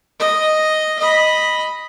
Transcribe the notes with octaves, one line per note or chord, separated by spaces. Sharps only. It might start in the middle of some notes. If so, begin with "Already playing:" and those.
D#5
D#5 B5